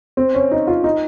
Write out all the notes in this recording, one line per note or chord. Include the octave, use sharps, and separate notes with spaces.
C4
C#4
D#4
F4
D#4